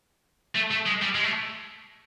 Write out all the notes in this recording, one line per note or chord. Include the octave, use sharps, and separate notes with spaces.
A3
A3
G#3
G3
G#3
A3